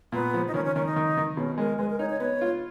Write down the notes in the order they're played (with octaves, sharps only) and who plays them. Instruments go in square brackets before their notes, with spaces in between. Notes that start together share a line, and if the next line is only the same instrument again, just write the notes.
[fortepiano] A#2 [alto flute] B3
[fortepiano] F3
[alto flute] D#4
[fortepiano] D#3 [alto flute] C#4
[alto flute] C#4
[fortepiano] D#3 [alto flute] C#4
[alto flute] D#4
[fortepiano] D#3
D#3
[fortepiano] B2 [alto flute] C#4
[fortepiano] G#3 [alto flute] A#4
[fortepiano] G#3 [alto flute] B4
[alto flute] A#4
[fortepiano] D#4 [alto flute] C#5
[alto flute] C#5
[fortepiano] B3 [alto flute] C#5
[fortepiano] F4